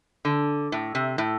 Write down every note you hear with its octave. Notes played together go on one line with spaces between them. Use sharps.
D3
A2
C3
A2